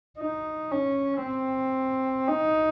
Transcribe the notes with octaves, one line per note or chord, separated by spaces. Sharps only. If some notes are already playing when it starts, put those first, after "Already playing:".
D#4
C#4
C4
D#4